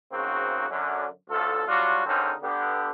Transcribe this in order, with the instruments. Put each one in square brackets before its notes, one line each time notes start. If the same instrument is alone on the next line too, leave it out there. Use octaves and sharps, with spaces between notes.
[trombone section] G#2 C#3 A#3 C4 F#4
F#2 D3
A1 D2 F4 A4
F#3 G3 D4 F4 F#4
G#1 D3 C4 C#4 D#4 A#4
D3 B3 G4